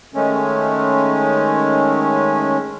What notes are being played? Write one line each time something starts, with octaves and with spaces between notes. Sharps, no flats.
D#3 G#3 A3 C#4